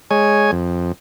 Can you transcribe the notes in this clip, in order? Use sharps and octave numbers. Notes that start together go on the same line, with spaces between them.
G#3 C#5 G#5
F2